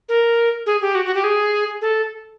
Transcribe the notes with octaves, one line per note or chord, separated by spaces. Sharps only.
A#4
G#4
G4
F#4
F#4
G4
G#4
A4